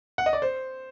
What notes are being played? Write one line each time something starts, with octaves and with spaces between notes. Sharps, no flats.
F#5
D#5
D5
C5